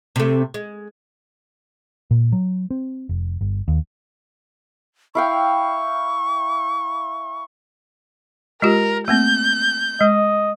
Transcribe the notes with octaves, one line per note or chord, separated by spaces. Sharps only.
C3 A3
G#3
A#2
F#3
C4
F1
G1
D#2
E4 F5 G5 C#6
G#3 F4 G4 A#4
A3 A#3 C4 G6
G#3 D#5